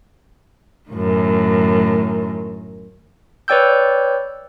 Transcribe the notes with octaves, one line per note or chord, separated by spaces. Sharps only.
F#2 A2 D#3
B4 C#5 D5 G5 E6 G6